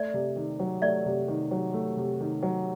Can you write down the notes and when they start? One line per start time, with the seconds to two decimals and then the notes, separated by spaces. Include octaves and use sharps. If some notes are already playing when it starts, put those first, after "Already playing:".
Already playing: A3 D5 E5
0.14 C3
0.36 D#3
0.60 F#3
0.82 A3 D5 E5
1.06 C3
1.28 D#3
1.51 F#3
1.74 A3
1.97 C3
2.21 D#3
2.43 F#3